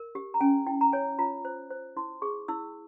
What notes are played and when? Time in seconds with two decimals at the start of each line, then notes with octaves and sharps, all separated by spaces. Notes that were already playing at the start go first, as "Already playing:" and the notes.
Already playing: A#4
0.15 G4
0.34 A#5
0.41 C#4 G#5
0.67 E4 G5
0.81 A#5
0.93 C#5 G#5
1.19 F4 A#5
1.45 C5
1.71 C5
1.97 E4 C6
2.22 G#4 C#6
2.48 E4 E6